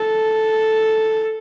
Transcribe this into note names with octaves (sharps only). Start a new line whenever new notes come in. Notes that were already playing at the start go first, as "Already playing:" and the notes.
Already playing: A4